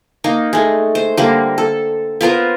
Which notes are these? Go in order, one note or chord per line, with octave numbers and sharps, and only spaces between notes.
A#3 D#4
G#3 A3
C5
D3 G3 A#3
A4
B3 F4 A#4 C5